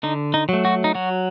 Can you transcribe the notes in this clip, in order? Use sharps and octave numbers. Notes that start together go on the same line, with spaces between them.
D3 D#4
D#4
F#3 A3
F#4
D#4
F#3 F#4